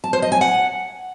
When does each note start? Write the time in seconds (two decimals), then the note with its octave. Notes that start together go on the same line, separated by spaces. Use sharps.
0.04 A5
0.13 C5
0.22 D#5
0.32 G#5
0.41 F#5